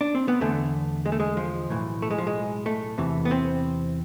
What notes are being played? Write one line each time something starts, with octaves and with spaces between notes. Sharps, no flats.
D4
C4
B3
E2 D3 A3
G#3
A3
G#3
F3
B1 A2 E3
A3
G#3
F3
G#3
A3
E2 C3 E3
B3
C4